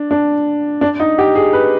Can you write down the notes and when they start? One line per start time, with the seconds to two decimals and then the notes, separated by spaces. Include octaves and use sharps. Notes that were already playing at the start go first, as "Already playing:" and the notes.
Already playing: D4
0.11 D4
0.81 D4
1.00 D#4
1.18 G4
1.35 G#4
1.53 B4